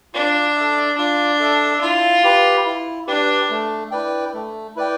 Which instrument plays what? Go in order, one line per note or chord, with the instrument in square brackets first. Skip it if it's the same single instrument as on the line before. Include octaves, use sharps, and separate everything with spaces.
[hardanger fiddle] D4 [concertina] F4
[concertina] A4 E5
[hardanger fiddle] D4 [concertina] F4
[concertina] A4 E5
[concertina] E4 [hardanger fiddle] F4
[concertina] G4 B4
E4
[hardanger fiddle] D4 [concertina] G4 B4
[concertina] A3
E4 B4 D5 G5
A3
E4 B4 D5 G5